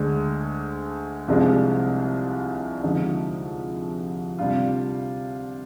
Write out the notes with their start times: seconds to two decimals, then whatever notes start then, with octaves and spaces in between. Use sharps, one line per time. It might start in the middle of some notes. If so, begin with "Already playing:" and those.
Already playing: D2 D3 G#3
1.28 C2 C3 F3 G#3 D4
2.83 F2 D3 G#3 D#4
4.39 C3 G3 D4 F4